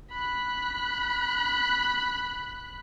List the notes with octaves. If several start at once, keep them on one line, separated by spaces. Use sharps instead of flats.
B5 F#6